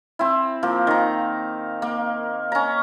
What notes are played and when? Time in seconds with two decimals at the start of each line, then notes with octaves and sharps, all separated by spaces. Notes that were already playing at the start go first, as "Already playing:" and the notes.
0.19 C4 E4
0.63 F3 A#3
0.87 D#3 A#5
1.82 A#3
2.52 C#4 A#5